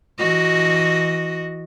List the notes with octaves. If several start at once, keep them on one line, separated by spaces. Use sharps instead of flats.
E3 F#4 D#5